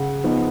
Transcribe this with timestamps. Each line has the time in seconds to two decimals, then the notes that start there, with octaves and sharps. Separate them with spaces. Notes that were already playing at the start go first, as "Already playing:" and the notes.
Already playing: C#3 F#5
0.24 F3 B3 D#4